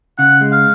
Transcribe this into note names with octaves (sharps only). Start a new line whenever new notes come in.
C#3 F#5
G#3
F5